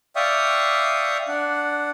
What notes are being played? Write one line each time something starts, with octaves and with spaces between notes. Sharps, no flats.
D5 E5 F5 G5 C#6 D#6
D4 D5 F#5